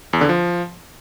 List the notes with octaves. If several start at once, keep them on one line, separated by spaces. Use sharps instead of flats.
E2
D3
F3